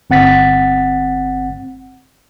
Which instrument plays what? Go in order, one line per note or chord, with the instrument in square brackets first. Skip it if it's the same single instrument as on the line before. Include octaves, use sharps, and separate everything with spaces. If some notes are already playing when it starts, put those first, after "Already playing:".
[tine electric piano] G1 C4 F#5 A6 B6